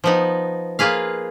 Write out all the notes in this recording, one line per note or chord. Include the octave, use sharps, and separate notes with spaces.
F3 B3 D#4
A#3 F4 G#4 B4 F5